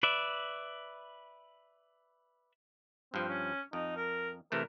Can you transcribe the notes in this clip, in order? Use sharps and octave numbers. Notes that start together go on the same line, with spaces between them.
B4 D5 E5
G2 F3 C4
C#4
F2 D#4
A#4
C3 E3 A3 A#4